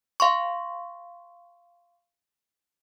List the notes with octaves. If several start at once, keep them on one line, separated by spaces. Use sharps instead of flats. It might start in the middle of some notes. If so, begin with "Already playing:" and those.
F5 C6 C#6